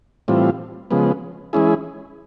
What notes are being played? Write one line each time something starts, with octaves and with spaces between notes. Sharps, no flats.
A2 E3 G3 C4 F4
C#3 F3 G#3 B3
E3 G#3 C#4 E4 G#4